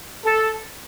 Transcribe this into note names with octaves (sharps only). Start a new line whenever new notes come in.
A4